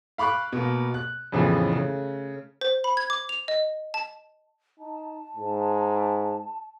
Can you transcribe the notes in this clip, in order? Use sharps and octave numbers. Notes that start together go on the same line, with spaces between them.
F5 B5 C#6 D6 F#6
B2 A#3
F#6
F2 A2 C#3 E3 F3 B3
C#3 A3
C5
B5
G#6
D6
F7
D#5
A5
D#4 A5
G#2